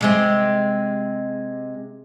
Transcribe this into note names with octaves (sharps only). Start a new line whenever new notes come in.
C3 G#3 C4